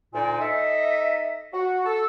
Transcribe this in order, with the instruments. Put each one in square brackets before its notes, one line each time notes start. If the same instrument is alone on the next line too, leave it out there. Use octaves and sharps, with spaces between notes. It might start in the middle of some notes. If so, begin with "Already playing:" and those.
[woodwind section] D2 A#2 D#4 D5 G#5
D#4 A4 D#5 E5
F#4
A4